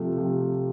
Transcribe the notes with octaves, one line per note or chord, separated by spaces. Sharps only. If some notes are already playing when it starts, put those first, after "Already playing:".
Already playing: C3 F3 A3
C3 F3 A3